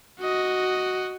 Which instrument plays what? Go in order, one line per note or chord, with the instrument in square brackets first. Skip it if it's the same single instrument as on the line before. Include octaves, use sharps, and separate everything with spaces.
[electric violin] F#4 D#5